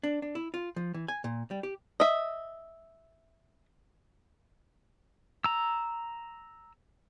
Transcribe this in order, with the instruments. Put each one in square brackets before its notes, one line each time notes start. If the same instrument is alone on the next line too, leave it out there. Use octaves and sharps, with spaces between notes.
[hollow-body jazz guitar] D4
D4
E4
F4
F3
E3
G#5
A#2
G3
G4
[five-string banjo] D#5 E5
[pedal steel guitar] A#5 E6